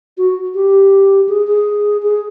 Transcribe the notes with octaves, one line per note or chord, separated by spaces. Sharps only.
F#4
G4
G#4
G#4
G#4